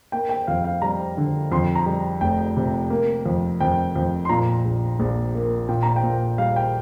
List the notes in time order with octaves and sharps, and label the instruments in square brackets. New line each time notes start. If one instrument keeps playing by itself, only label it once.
[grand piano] A#3 G5
G5
F2 F5
F5
G3 A#5
D3
F2 C6
A#5
G3
F1 G5
C3
A#3
F2
F2 G5
F2
C6
A#2 A#5
A#1
A#1
A#3
A#2 G5
A#5
G5
A#2
G3 F5
G5